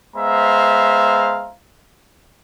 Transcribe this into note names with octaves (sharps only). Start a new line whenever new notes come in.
G#3 B3 C5 E5 F5 A#5